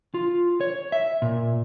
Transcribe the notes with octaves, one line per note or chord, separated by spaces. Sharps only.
F4
C#5
E5
A#2